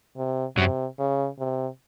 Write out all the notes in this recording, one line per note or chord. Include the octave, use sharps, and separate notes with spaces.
C3
F#2 C3 F#3
C#3
C3